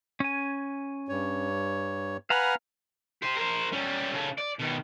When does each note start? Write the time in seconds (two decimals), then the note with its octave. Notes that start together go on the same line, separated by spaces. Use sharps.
0.20 C#4 G#5
1.09 G2 C#5
2.30 B4 F5 F#5 G#5 A#5 B5
3.22 G4 C5
3.37 A#4 C5
3.73 G3 C#4
4.14 C#3 A4
4.38 D5
4.60 B2 D#3